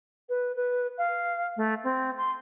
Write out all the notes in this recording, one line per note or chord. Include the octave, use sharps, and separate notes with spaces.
B4
B4
F5
A3
C4
C6